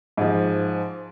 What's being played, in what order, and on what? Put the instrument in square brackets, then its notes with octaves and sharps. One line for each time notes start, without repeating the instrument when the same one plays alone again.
[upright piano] G#2 F3